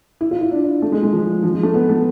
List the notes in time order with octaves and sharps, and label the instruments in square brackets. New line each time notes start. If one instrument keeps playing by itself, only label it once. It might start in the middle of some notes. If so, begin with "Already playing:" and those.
[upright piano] E4
F4
E4
D4
A3
G#3
G#3
F3
F3
G#3
A3
B3
A3